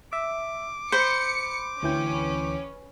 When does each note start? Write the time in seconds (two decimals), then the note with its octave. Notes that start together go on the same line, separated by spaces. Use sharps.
0.13 E5 D6
0.92 C5 B5 C#7
1.83 D2 E3 C#4 B4 G5